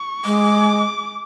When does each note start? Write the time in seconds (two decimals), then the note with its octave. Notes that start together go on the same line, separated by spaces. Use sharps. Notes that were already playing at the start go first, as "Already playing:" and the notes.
Already playing: C#6
0.24 G#3 D6